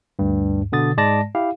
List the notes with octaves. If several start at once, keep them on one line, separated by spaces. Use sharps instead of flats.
D2 G2
B2 D3 D#6 A6
G#2 G#3 D5 A5 A#6
E4 G4 F5